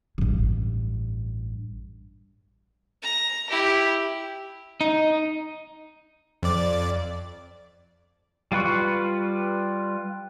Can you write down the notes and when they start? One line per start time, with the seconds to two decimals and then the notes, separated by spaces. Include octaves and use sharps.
0.18 A1 G2
3.02 A#5
3.50 E4 G4
4.81 D#4
6.43 F2 D5
8.52 G3 F4 B4 C#6